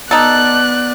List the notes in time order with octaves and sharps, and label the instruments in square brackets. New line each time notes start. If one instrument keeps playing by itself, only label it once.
[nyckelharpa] B3 D5 [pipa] D#4 A4 [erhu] F#6